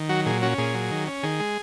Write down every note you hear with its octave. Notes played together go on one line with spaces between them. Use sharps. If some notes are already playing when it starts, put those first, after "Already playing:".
Already playing: D#3
F#3 F#4
A#2 G#4
C#4 F#4
A#2 G#4
F#3
D#3
C#4
D#3 G#4
G#3